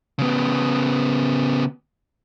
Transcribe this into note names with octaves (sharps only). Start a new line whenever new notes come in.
C#3 B3